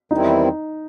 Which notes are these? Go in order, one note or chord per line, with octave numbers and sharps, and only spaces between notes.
E2 D#3 G3 C4 D#4 E4